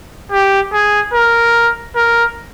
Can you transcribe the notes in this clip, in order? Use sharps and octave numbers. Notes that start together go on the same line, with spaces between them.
G4
G#4
A#4
A#4